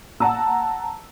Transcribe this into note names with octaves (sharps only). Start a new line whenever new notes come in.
F#5 A5 A#5 E6